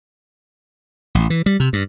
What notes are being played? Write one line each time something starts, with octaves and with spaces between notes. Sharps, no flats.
A1
E3
G3
C3
G2